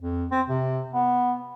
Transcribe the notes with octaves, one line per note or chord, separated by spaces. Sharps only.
F2
C4
C3
B3